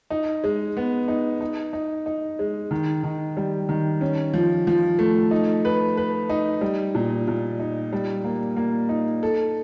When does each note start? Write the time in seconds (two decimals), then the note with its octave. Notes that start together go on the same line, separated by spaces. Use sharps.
0.10 D#4
0.44 G#3
0.77 B3
1.08 D#4
1.41 D#4
1.73 D#4
2.06 D#4
2.39 G#3
2.71 D#3
3.03 D#3
3.37 G3
3.69 D#3
4.01 C#4
4.34 F3
4.67 F3
4.99 A3
5.31 D#4
5.65 B4
5.97 B4
6.29 D#4
6.61 G3
6.95 A#2
7.27 A#2
7.60 D#4
7.92 G3
8.24 A#3
8.57 A#3
8.89 D#4
9.23 A4